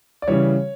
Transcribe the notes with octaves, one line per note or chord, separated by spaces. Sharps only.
D5
C#3 E3 G3 C#5